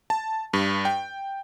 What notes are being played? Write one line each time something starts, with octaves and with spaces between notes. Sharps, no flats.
A5
G2
G5